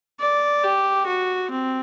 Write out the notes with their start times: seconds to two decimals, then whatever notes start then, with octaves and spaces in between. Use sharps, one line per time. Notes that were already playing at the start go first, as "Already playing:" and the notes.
0.20 D5
0.64 G4
1.07 F#4
1.51 C4